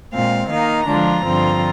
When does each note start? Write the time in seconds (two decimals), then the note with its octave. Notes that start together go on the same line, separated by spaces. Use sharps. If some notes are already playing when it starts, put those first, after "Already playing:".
0.13 A#2 G#3 C4 F5
0.50 D#3 A#3 D#4 F5
0.88 D3 F3 G#3 D4 F4 A#5
1.25 G2 D3 F3 C4 F4